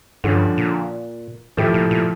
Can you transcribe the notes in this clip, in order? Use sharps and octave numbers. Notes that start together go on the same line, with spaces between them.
G2 D3 F3 C#4
A#2
A2 F3 A3 E4 G4
A#2
A#2